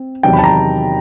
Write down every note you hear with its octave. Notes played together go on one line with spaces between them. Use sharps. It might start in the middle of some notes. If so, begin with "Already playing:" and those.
Already playing: C4
E2 C3 D#3 F#3 G5
B5
A5
A#5